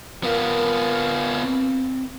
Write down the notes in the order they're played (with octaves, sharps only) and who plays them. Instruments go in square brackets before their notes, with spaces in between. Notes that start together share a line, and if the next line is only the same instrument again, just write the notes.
[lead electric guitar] B3 F4 [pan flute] A#4
[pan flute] C4